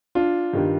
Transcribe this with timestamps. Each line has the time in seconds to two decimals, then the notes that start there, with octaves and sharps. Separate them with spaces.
0.15 D4 F4
0.53 G2 D#3 G3